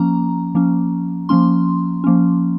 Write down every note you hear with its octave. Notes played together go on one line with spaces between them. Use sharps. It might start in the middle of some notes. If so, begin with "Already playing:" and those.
Already playing: F3 A#3 C#4 A#5
F3 A#3 C#4
F3 A#3 C#4 C6
F3 A#3 C#4